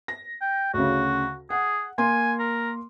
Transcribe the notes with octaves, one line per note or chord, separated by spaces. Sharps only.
A#6
G5
D2 C#3 F#4
G#4 F#5
A#3 G#5 C6
A#4